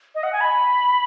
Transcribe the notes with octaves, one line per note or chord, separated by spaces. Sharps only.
D#5
F#5
G#5
B5